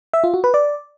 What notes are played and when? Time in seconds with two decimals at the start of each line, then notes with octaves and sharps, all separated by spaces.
0.13 E5
0.24 F4
0.34 F#4
0.44 B4
0.54 D5